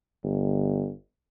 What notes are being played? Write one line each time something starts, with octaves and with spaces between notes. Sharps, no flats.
G1